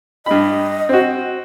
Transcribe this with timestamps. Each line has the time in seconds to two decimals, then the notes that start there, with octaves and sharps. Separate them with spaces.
0.26 G2 D#5 B5
0.89 C4 F#4